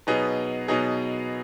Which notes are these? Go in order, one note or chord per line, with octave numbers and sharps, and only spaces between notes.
B2 F#3 B3 D#4 G#4
B2 F#3 B3 D#4 G#4